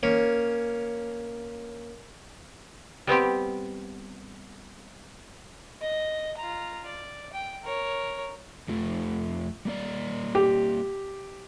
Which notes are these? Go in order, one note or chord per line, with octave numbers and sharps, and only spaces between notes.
A#3 C#4 C#5
G3 B3 C4 G4
D#5
F4 A#5
D5
G5
A#4 C#5
F2 F3 A3
G3 A#3 D5
G4